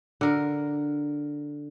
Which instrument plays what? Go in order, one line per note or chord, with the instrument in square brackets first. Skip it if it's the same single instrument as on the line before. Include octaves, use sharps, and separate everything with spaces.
[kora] D3 A#4